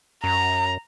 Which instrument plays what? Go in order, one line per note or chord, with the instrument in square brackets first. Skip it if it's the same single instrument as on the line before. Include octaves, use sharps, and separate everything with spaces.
[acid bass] F#2 [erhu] A#5